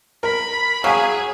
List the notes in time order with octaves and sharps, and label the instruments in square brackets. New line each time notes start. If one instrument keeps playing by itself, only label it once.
[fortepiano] A#4 [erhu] B5
[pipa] F#3 [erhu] G#4 [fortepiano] F5 G#5